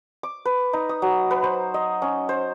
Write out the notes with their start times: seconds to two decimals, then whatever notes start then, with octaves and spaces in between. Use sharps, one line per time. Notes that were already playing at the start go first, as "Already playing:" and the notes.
0.23 D6
0.45 B4
0.73 D#4
0.89 D#6
1.02 F#3
1.31 B4
1.44 C5
1.74 D#5
2.02 C#4
2.29 C5